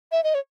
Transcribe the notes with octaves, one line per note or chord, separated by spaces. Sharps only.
E5
D#5
C#5